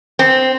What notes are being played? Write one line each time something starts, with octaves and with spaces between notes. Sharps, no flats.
C4